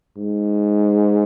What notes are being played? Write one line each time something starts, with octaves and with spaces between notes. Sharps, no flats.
G#2